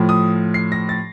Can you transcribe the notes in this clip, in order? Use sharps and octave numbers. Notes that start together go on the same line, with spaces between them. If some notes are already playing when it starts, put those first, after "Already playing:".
Already playing: A2 F3
D#6
C7
A#6
A6